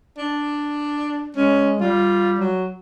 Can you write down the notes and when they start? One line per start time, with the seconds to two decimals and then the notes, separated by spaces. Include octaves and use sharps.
0.18 D4
1.37 G#3 C#4
1.81 G3 F4
2.39 F#3